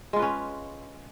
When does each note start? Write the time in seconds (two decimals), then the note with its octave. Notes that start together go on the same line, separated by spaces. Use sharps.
0.13 G#3
0.16 F4
0.19 B4
0.22 C#4